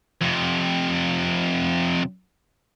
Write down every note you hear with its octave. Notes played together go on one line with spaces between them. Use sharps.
F2 C3